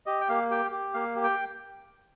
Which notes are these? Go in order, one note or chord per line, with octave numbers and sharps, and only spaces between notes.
G4 D#5
G5
A#3 F5
G4 G5
G4
A#3 F5
G4
G5